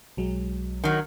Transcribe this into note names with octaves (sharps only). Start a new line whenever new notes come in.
B1 F#3 G#3
D#3 F#3